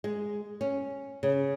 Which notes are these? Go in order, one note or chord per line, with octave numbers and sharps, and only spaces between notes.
G#3
C#4
C#3